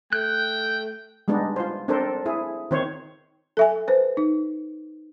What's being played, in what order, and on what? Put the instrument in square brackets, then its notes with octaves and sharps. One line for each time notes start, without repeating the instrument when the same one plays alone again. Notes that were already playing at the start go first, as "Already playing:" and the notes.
[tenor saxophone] A3 [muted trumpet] G5 [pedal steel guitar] F#6
[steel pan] G3 G#3 B3 D4 D#4
F4 C5
C4 D4 A4 A#4 C5
E4 G#4
D#3 C4 C5 C#5
[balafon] A4 E5 G#5
B4 C5
D#4